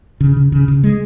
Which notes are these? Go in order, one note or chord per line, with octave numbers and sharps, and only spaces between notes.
C#3
C#3
C#3
C#3
G#3